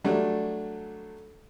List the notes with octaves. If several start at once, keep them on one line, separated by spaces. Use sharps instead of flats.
F#3 G3 A3 D4